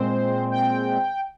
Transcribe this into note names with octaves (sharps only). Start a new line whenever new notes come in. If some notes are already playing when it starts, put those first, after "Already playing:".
Already playing: A#2 G#3 C4 C5
G5